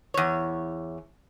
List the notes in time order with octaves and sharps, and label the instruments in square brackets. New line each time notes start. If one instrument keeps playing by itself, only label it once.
[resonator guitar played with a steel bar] E2 C#5